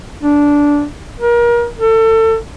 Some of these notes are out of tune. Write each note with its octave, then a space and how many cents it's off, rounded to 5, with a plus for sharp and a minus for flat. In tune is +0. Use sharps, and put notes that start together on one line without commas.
D4 -10
A#4 +30
A4 +30